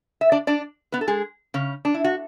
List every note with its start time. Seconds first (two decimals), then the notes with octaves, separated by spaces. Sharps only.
0.21 E5
0.32 D4 D5
0.47 D4 D5
0.92 B3 B4
1.01 A4
1.08 G#3 G#4
1.54 C#3 C#4
1.85 D4
1.94 E4
2.04 F#4